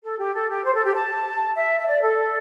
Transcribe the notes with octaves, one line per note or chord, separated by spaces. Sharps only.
A4
G4
A4
G4
C5
A4
G4
A5
E5
E5
D5
A4